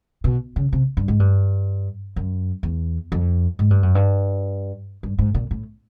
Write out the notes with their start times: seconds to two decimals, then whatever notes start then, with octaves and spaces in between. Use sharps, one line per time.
0.24 B2
0.56 C#3
0.73 C3
0.97 G2
1.08 G#2
1.20 G2
2.16 F#2
2.63 E2
3.12 F2
3.59 G#2
3.71 G2
3.83 F#2
3.95 G2
5.03 G2
5.19 G#2
5.35 A#2
5.51 A2